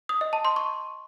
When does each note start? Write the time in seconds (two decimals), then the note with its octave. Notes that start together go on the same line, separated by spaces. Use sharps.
0.09 D#6
0.21 D#5
0.33 A5
0.45 C6
0.56 C#6